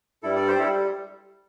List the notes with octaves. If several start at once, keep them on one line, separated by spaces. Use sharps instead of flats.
G2 G3 E4 A4
A4 D5
G4 C5
G3 E4 A4